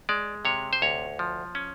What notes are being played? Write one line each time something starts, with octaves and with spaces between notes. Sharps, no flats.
G#3 D5
C3 C#5
C5
D2 C#5
F3
C#4